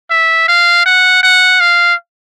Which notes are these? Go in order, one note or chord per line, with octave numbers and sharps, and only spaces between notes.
E5
F5
F#5
F#5
F5